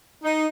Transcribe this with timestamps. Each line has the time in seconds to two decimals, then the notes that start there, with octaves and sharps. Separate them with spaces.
0.24 D#4